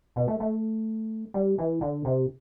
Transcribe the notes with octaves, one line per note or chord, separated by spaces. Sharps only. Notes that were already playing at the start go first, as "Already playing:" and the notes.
B2
A3
A3
G3
E3
D3
C3